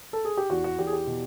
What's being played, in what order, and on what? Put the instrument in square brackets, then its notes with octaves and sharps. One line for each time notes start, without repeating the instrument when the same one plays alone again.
[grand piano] A4
G#4
G4
E2 F#4
F#4
E2 G4
G#4
G4
B2